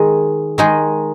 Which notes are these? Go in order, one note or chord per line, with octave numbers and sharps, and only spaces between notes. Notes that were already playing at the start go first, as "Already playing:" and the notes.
Already playing: D#3 G#3 D#4 G#4
D#3 G#3 D#4 G#4